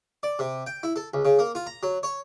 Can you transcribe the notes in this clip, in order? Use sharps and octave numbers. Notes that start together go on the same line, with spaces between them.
D5
C3
G5
E4
A4
C#2
C#3
A#3
F4
A#5
F#3
C#5